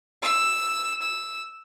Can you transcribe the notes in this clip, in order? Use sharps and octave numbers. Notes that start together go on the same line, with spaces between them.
E6
E6